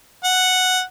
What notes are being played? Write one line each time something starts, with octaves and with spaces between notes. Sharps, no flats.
F#5